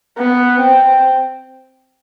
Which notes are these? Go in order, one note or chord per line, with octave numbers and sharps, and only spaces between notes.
B3
C4